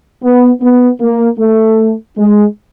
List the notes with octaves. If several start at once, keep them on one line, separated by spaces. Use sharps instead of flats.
B3
B3
A#3
A3
G#3